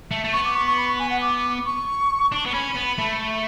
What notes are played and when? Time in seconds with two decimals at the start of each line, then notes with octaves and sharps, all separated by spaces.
0.11 A3
0.24 A3
0.33 B3 C#6
0.45 D6
0.55 C#6
0.66 C#6
0.78 B5
0.88 C#6
0.99 G#5
1.10 F#5
1.22 D6
1.66 C#6
2.32 D4
2.45 B3
2.53 C#4 B5
2.75 B3
2.98 A3